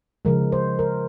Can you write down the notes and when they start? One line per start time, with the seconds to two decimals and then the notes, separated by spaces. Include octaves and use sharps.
0.25 C#3 F3 G#3 A#4
0.52 C5
0.79 A#4